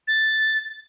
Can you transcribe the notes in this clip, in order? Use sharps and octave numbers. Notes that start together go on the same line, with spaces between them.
A6